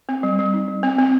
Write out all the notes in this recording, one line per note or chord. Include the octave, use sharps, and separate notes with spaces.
C4
G3
G3
D#4
G3
C4
C4